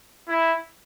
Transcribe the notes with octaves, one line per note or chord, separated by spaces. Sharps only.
E4